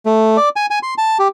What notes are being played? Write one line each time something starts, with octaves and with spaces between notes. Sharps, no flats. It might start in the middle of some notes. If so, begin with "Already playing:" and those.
A3
D5
G#5
G#5
C6
A5
G4